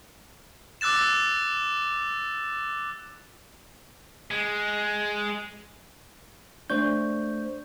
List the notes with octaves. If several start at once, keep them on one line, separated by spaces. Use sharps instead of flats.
D6 E6 F#6 A6 E7
G#3
A3 D4 C5 D5 C#6 G6